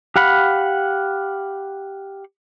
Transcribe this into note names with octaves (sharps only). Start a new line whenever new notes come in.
G4 F5 F#5 B5